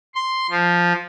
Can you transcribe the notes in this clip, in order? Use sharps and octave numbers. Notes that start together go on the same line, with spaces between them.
C6
F3